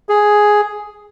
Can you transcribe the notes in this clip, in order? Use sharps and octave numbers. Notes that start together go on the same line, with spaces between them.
G#4